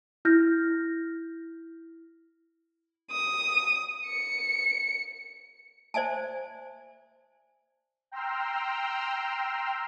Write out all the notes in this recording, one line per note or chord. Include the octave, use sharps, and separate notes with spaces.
E4 F6 G6 A#6
D#6
C#7
C5 D5 E5 G#5 A5
G5 A#5 C6 E6 F6